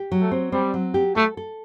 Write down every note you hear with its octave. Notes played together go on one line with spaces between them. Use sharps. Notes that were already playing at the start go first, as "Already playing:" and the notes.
Already playing: G4
F#3
A3
C4
G3 C4
F#3
G4
A3 A4
A4